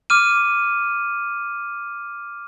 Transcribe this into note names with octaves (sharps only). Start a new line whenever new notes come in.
D6 F6 D#7